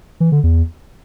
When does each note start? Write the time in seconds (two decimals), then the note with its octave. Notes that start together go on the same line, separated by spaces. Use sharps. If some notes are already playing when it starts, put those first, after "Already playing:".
0.20 E3
0.32 D3
0.44 E2